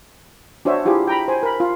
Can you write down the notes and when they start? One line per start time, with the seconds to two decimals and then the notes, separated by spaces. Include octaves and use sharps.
0.65 D4 F#4 C5 C#5 E5
0.85 E4 F4 G4 G#4
1.07 G5 A#5 B5
1.28 C5 G#5
1.43 A#4 B5
1.60 F4